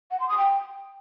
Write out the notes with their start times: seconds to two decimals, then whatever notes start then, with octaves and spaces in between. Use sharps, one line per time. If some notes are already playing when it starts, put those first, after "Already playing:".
0.11 F#5
0.19 C6
0.28 D#6
0.37 G5